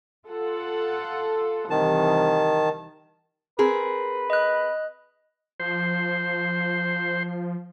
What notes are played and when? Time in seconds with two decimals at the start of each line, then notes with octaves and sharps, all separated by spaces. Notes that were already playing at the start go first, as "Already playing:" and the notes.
0.27 F4 A4 F#5
1.70 C2 D#3 E3 A5
3.59 C4 G#4 A#4 B4
4.30 D#5 F#6
5.60 F3 C5